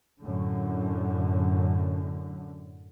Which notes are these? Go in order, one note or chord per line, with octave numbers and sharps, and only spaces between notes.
F#2 A2 D3